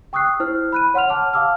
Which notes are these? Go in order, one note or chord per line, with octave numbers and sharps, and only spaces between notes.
G5 C#6 D#6 E6 F#6 C7
E4 C5 F6
B5 F#6 D#7
C#5 F#5 C6 F6 F7
A5 D6 F6
F5 A5 D6 E6 F6